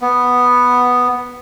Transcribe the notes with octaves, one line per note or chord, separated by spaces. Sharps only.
B3